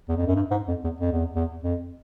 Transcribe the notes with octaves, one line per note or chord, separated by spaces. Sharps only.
E2
F2
F#2
G2
G#2
F2
E2
F2
E2
E2
F2